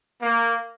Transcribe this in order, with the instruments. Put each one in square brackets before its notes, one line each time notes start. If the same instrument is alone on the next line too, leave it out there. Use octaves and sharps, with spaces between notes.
[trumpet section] A#3